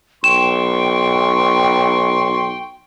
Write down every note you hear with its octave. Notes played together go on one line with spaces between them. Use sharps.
B1 G5 C6 C#6 E7